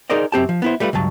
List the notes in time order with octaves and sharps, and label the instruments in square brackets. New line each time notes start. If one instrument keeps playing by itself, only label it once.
[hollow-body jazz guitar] D#4 G#4 A#4 C5 D5 D#5
F#2 C4 G4 A5
F3
B3 E4 C5
G3 A3 F4 B4
C#2 G2 F#3 A5